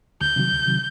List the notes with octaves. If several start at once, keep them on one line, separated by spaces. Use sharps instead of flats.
D2 G6
C3 D#3 F#3
D2
C3 D#3 F#3